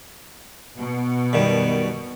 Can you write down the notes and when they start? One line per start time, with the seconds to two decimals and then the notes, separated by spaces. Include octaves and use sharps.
0.78 B2
1.33 F#2 D#3 G3